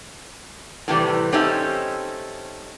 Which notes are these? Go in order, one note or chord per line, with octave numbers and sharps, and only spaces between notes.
A2 C3 E3 G3
A3 C4 C#4 D#4 G4 E5